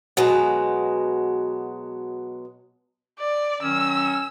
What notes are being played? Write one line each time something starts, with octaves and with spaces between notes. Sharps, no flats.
B2 F#3 G#3
D5
D#3 F#3 C#4 E6